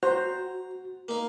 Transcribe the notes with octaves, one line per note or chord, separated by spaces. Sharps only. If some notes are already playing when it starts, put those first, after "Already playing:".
F#4 C5 A#5
A#3 D#4